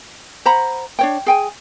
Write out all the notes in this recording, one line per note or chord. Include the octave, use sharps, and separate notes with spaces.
C5 F#5 A#5 B5
D4 C#5 G5
G#4 G5 G#5